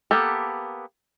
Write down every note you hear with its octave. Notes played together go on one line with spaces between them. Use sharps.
A#3 B3 G4 A4